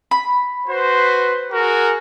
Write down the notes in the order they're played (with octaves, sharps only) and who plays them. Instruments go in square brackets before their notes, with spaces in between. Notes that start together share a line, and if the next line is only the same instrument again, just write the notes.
[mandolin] B5
[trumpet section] F#4 B4 C5
F#4 G#4 A#4